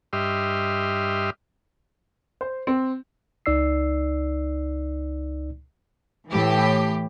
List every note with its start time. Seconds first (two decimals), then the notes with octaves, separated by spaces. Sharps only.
0.13 G2 G4 D#5 E5 C6 F6
2.41 C5
2.67 C4
3.46 C#2 D#4 D5 E6 C7
6.30 A2 E3 G4